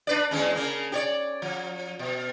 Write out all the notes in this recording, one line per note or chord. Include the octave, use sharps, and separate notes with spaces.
D4 B4 D5
E2 G#3 C#4
C#3 A#3
G4 C#5 D5
F3
B2